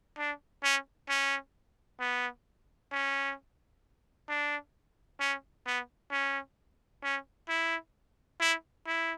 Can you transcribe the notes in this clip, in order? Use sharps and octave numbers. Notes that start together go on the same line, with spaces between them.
D4
C#4
C#4
B3
C#4
D4
C#4
B3
C#4
C#4
E4
E4
E4